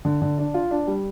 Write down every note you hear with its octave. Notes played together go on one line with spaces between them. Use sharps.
D3
D3
D4
F4
D4
G3